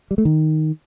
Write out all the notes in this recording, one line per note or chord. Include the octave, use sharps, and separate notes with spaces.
G3
A3
D#3